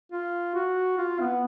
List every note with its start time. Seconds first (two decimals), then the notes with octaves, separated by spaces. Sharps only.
0.12 F4
0.55 F#4
0.98 F4
1.21 B3